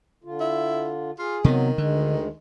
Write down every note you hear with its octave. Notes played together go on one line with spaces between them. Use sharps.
D3 F4
E4
F4 G#4
C3 D#3 F#3 B3
D2 D3 G#3